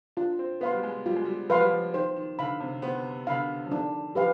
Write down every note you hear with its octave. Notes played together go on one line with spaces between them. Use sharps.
D4 F4
C4
B3 B4 F5 C6
G3
G#3
G3 F4
G#3
G3
F3 B4 F5 C6
G3
F3
D#3 C5
D#3
D3 F5 B5
C3
B3 C5
D3 F5 B5
F3
D#3 D4
F3 G4 B4 F5